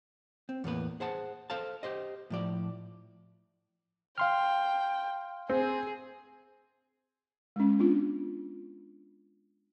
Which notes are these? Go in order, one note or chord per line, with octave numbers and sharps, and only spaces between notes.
C4
E2 A2 A#3 B4
G#4 C5 F#5 A5
A4 C5 F5 A5
G4 C5 D#5
A2 F3 D5
F5 G5 C6 F6
C4 G#4
G#3 C#4
B3 D4 F4